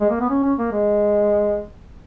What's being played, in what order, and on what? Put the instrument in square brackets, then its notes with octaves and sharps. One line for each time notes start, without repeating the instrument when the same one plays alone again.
[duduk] G#3
A#3
B3
C#4
C#4
A#3
G#3